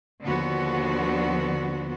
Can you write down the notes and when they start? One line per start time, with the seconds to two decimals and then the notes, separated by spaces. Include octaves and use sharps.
0.23 D#2 D3 F3 B3 F#4